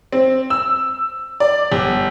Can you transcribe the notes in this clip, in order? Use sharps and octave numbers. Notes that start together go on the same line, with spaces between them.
C4
E6
D5
G1